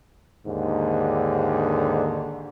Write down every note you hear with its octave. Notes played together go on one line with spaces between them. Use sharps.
D#2 G#2 D3